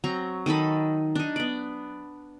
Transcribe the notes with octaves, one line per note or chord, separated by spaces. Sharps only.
F#3 C4 A#5 C#6
D#3 D#4 A4 B5
D4 D#4
B3 D5